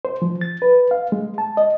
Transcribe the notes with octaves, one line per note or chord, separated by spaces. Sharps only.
C5
F3
A6
B4
F5
G#3
A5
D#5